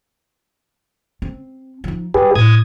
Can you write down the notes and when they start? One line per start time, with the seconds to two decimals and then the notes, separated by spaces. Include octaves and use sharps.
1.22 C4
1.84 F3 D#4
2.14 G2 G4 G#4 B4
2.36 A2 D#6 G#6